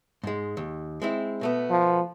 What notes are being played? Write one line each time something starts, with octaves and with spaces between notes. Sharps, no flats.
G#2 G#3
D#2
G#3 C4 E4
B2 A3 B3
F3